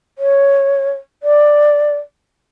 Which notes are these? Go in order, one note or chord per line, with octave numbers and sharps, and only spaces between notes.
C#5
D5